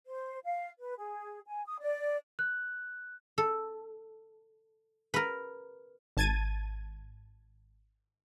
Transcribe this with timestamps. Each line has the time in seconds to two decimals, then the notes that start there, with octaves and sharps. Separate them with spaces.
0.06 C5
0.43 F5
0.79 B4
0.98 G#4
1.46 G#5
1.66 D#6
1.81 D5
2.39 F#6
3.38 A4
5.14 A#4 B4
6.17 G#1 A5 G#6 A6 D#7